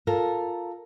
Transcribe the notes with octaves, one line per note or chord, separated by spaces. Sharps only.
F4 A4 A#4